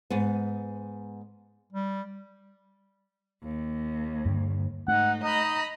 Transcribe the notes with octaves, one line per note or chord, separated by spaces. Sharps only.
G#2 B3
G3
D#2
G2 D3
G#2 A3 D#4 F#5
D#4 D#5 A#5 B5